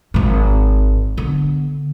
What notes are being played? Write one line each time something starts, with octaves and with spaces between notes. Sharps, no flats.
G#1 G#2
D3 B3